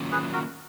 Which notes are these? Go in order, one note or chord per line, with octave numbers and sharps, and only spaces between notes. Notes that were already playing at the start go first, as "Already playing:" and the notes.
Already playing: D#3 F#3 A#3 C#4 F4
G#4 B4
F#4 A#4